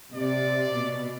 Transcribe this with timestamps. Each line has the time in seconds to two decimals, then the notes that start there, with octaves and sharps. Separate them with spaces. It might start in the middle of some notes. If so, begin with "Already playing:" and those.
0.14 C3 D5
0.71 B2